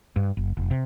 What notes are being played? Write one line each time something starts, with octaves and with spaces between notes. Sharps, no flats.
G2
F#1
F1
C3